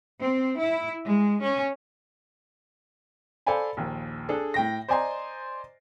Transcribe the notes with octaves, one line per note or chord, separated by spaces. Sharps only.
C4
E4
G#3
C#4
A4 C5 D5 F5 G#5 B5
A#1 D#2
D4 G#4 A4
A2 G5 A#6
C5 D5 D#5 G#5 A#5 C6